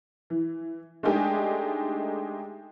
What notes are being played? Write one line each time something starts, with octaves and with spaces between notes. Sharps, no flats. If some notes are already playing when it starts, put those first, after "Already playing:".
E3
G#3 A3 D4 D#4 G4 G#4